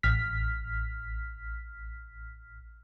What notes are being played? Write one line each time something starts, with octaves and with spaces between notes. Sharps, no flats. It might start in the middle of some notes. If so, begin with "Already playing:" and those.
A1 F6 B6